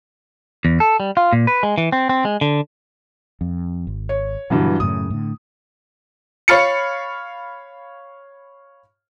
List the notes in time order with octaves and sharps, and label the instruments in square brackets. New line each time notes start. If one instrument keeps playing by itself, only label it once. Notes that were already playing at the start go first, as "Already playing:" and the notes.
[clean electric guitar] E2
A4
G3
F4
A#2
B4
G#3
E3
C4
C4
G#3
D3
[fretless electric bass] F2
G#1
[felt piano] C#5
[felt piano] G2 E3 F#3 [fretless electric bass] B2 D3
[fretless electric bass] F#2 A2 C#3 [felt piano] D#6
[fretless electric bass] A2 D3
[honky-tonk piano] C#5 F5 B5 F6 A6 C#7